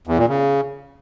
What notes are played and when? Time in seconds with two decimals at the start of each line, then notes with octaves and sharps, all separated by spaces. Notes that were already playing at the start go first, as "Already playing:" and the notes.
0.07 E2
0.18 A#2
0.29 C#3